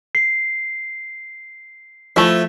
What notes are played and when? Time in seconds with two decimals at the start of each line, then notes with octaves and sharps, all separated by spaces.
0.15 C7
2.16 F3 A3 E4